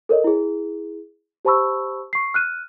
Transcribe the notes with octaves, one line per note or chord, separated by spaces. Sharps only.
A4 A#4 C#5 D#5
E4 G#4
G4 C5 A5 B5 C#6 E6
C#6 C7
F6 F#6 D#7